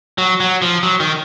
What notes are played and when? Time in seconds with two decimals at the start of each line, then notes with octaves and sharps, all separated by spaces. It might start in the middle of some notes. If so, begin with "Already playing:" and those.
0.18 F#3
0.40 F#3
0.62 F3
0.83 F#3
1.00 D#3